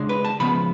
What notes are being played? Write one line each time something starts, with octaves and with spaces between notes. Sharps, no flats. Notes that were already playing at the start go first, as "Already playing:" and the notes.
Already playing: C#3 G#3 D4
B4
A5
C#3 F3 B3 B5